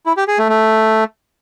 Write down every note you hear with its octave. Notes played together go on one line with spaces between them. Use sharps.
E4
G4
G#4
A3
A3